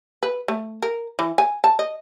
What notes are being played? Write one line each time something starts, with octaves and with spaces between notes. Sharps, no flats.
B4
A3
A#4
E3
G#5
A5
D#5